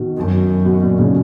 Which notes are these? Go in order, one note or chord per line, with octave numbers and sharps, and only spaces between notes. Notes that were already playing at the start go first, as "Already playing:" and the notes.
Already playing: B2 D#3
F#2
B2
A#2
A#2 C#3